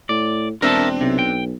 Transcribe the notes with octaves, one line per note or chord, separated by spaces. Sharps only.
A2 D5
E1 C4 D4 A#4 E5 A5
B1 C3
G5